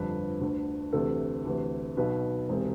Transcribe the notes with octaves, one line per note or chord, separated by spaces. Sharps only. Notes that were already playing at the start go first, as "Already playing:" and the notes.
Already playing: G1 F2 D3 B4
D2 D3
D2 C3 E3 A4
D2 C3 E3
B1 B2 B4
E1 C3 C5